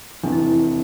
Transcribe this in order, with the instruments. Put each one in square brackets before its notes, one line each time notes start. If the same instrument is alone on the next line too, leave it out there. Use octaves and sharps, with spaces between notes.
[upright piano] F1 E2 C3 E3 [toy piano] D4
[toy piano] E4